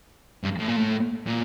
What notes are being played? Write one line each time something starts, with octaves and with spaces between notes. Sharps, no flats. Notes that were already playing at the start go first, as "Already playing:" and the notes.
G2
A2
A#2
A2
A#2